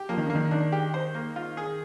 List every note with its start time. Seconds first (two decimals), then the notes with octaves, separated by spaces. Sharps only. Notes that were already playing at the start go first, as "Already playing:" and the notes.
Already playing: G4
0.09 F3 A#3
0.17 D#3
0.26 D3 A#3
0.35 D#3
0.51 D#3 D4
0.72 G4
0.94 C5
1.15 A#3
1.36 F4
1.57 G#4